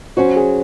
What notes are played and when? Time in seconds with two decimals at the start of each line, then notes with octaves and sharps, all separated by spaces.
0.17 F#3 C#4 F#4 C5
0.36 G#4